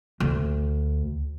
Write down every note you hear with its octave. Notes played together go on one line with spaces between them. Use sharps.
D2